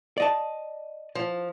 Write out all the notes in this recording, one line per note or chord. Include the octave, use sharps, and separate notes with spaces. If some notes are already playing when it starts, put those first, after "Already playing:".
D5 D#5 A5
F3